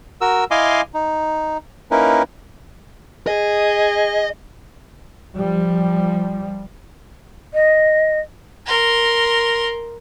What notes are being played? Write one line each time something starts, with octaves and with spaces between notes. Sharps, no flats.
F#4 A#4 E6
E4 D#5 F5 G#5 C6 D6
D#4
A#3 C#4 D#4 E4 A#4 B4
G#4 D#5
F3 G3
D#5
A#4 C6